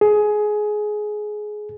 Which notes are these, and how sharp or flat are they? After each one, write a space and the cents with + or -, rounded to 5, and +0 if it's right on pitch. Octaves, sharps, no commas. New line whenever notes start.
G#4 +15